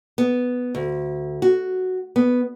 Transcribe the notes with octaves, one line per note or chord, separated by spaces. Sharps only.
B3
D2
F#4
B3